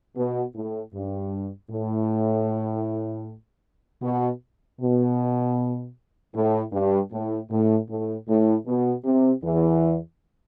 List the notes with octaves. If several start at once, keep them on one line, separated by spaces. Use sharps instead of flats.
B2
A2
G2
A2
B2
B2
A2
G2
A2
A2
A2
A2
B2
C3
E2 E3